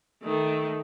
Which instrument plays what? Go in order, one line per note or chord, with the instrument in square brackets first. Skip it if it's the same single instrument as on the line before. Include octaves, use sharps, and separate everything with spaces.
[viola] D#3 A3